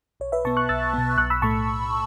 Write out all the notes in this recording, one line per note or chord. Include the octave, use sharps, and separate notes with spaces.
B1 C#5
B4 E5
B2 B3 A5 C#6
C#6 F#6
B1 E6 A6
B2 B3
B1 C#6 F#6
B5 E6
A2 A3 A5 C#6